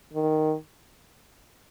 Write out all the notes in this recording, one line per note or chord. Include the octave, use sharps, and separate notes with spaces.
D#3